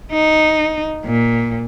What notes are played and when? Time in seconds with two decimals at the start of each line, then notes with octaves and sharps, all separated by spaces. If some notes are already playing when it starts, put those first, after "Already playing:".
0.13 D#4
1.05 A#2